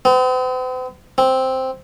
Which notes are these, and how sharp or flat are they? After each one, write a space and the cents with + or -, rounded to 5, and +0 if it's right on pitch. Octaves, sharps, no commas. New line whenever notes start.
C4 -45
C4 +0